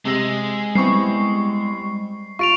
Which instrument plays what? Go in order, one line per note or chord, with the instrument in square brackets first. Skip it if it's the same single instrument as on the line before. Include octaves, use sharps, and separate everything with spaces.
[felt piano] C3 E6 A#6 [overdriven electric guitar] G#3
[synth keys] G3 C#6 [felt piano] B3 C4 E4 [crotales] C7
[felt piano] F4 [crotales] C#6 D7 F7